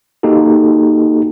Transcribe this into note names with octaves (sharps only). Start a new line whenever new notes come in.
A#3 D#4 F#4 G4 A4